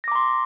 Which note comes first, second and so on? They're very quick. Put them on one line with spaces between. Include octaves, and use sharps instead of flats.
A#6 D6 A#5 C6